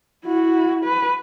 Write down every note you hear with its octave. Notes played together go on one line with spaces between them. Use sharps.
E4 F#4
B4